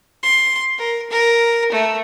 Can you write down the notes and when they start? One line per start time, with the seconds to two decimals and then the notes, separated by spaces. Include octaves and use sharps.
0.23 C6
0.79 A#4
1.10 A#4
1.72 A3